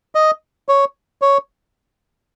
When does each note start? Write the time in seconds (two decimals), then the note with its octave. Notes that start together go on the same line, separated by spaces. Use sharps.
0.15 D#5
0.69 C#5
1.22 C#5